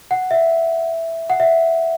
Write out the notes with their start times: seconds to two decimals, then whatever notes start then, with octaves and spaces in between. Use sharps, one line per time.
0.11 F#5
0.31 E5
1.30 F#5
1.40 E5